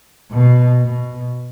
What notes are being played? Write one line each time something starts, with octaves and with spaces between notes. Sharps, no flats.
B2
B2